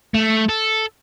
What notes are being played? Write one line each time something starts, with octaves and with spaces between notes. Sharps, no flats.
A3
A4